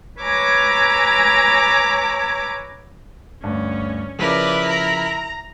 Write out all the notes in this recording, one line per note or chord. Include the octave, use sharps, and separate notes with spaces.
B4 C#5 G#5 A#5 D6 E6
D2 G2 C#4
C#3 F3 E4 A#4 B4 D5
A#5